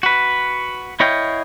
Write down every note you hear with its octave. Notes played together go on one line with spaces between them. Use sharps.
F#4 B4
E4 C#5 D#5 F5 G5